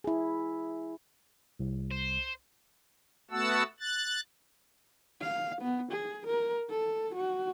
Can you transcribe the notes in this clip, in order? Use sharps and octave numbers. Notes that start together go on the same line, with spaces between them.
E4 G#4
C2
C5
A3 B3 F#4 F#5 A5 E6
F#6 A6
F5
B3
G#4
A#4
A4
F#4